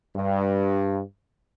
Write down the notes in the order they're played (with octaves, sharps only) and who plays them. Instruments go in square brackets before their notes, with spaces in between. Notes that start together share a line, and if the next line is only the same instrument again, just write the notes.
[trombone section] G2